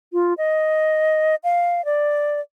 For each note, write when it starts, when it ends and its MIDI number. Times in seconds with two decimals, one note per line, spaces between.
0.13 0.34 65
0.38 1.35 75
1.44 1.85 77
1.85 2.40 74